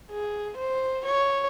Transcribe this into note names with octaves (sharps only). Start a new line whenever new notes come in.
G#4
C5
C#5